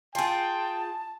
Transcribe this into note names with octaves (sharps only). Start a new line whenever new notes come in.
F4 G#4 G5 A5